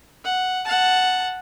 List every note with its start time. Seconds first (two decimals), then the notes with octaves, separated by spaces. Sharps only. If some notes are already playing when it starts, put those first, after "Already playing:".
0.24 F#5
0.65 F#5 A5